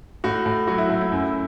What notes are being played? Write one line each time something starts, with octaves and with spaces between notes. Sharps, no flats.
A2 F#4
A2
F#3 F#4
E4
A2
E4
F#2